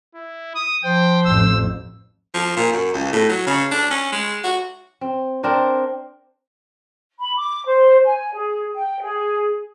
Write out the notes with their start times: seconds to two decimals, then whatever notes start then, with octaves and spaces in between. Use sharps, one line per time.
0.14 E4
0.55 D#6
0.84 F3 C5 G5
1.25 A1 F2 E6
2.34 F3
2.57 A#2
2.72 F#2
2.94 C#2
3.13 A2
3.29 F#3
3.47 C#3
3.71 D4
3.91 C#4
4.12 G#3
4.44 F#4
5.01 C4
5.43 C4 D4 A#4 C5
7.20 B5
7.37 D6
7.67 C5
8.05 G#5
8.34 G#4
8.75 G5
9.00 G#4